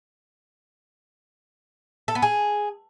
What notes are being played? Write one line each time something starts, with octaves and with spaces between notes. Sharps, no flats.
A4
B3
G#4